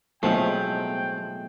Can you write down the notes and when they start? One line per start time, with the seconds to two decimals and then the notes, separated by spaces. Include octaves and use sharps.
0.23 B1 A2 F3 G#3 A3 C4 D#4 G5